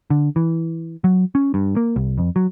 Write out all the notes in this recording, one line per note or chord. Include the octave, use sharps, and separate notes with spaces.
D3
E3
F#3
C#4
G2
A#3
C2
F2
F#3